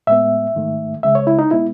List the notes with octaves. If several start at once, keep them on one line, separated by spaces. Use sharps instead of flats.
A2 G#3 B3 E5
G#2 D#3 A3
C#2 C#3 G#3 E5
C#5
E4
D#4
B2 G#3 B3 E4